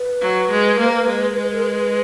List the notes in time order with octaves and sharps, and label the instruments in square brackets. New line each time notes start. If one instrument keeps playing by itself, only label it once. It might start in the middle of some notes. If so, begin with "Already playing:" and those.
Already playing: [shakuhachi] B4
[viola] F#3
G#3
A#3
G#3
G#3
[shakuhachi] A#4
B4